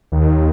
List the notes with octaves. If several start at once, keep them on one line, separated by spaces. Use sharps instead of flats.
D#2